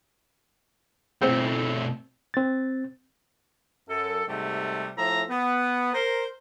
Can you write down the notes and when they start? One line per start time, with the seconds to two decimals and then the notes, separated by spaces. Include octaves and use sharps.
1.21 B2 A3 C4 C5
2.34 C4 A6
3.89 F#2 A4
4.27 G#2 C3 G3 A3
4.97 A2 F3 E5 A#5
5.29 B3
5.94 A#4 C5